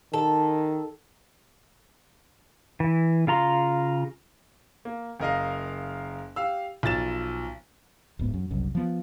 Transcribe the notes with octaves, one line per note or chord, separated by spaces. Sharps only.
D#3 A4
E3
C#3 F4 A#5 C6
A#3
F#1 A#4 D#5 F5
G4 F5 E6
B1 F3 A6 E7
D1 G#2 B3
F#2
F#1 C2 F#2
F3 B3